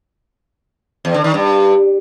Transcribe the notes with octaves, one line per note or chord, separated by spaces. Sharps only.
E2
D3
D#3
G2